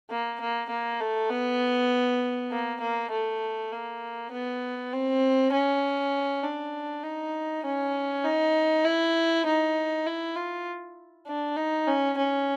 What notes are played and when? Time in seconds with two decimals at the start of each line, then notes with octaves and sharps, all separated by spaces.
0.10 A#3
0.41 A#3
0.70 A#3
1.00 A3
1.30 B3
2.51 A#3
2.81 A#3
3.11 A3
3.72 A#3
4.32 B3
4.93 C4
5.53 C#4
6.43 D4
7.04 D#4
7.65 C#4
8.24 D#4
8.85 E4
9.46 D#4
10.06 E4
10.36 F4
11.27 D4
11.57 D#4
11.87 C#4
12.17 C#4